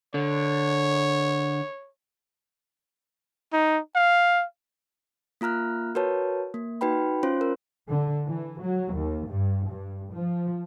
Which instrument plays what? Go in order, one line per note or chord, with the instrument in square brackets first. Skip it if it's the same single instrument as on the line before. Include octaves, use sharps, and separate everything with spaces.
[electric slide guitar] D3 [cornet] C#5
[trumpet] D#4
F5
[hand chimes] A#3 F4 A#5 F6 F#6
F#4 A#4 B4 C#5 A5
A#3
D#4 F#4 B4 G5 B5
C#4 F4 C5 C6
A#4
[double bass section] D3
E3
F#3
D#2
G2
G2
F3